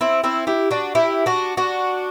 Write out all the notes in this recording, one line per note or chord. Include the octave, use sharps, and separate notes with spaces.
C4 E4
C4 E4
E4 G4
D4 F#4
E4 G4
D4 F#4
D4 F#4